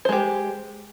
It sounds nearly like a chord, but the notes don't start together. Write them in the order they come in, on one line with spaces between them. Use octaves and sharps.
C5 G#3 G4